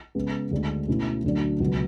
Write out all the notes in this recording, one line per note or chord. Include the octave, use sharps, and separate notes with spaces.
C#3 G#3 B3
D2 D3 G#3 D4
B2 A3 C#4 E4
D2 D3 F#3 A3 D4
C#2 B2 F#3